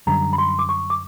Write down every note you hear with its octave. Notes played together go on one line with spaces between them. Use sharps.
F#2 D3 G3 A#5
B5
C6
D6
C#6
D6